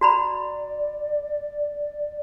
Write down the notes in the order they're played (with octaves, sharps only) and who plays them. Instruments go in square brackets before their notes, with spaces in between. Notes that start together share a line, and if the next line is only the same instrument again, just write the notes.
[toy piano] F#4 A#5 B5 [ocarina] D5